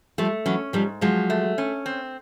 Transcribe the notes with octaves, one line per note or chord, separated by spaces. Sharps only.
F3 G3 A3
E3 F#3 C#4
G#2 F3 G3
F3 F#3 G#3
A3
C#4
C4